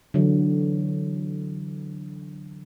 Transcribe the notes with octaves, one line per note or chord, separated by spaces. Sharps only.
D3 E3 F#3